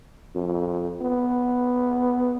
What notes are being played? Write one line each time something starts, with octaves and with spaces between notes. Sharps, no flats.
F2
B3